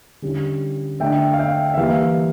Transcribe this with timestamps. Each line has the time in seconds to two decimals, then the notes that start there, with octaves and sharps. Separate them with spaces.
0.22 D3 G3 C#4 E4
1.00 D3 A3 D4 E5 G5
1.34 F5
1.39 E5 G5
1.74 E5
1.77 E3 G3 A#3 F5